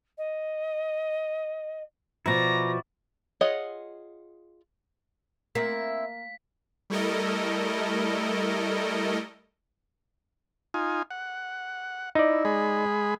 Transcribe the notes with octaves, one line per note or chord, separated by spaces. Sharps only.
D#5
B2 F3 E4 F#4 D5 A#5
F4 G#4 C#5 D#5 F#5
A#3 C4 E4 E5 B6
G3 A3 E4 A4 A#4 D#5
D#4 F4 G#5
F#5
D#4 E4 D5
G#3 G#4 B5